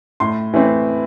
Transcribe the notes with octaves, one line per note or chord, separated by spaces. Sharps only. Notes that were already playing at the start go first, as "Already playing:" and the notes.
A2 C6
E3 A3 C4